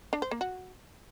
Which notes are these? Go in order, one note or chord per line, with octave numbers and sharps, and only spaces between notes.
D4
C5
A#3
F#4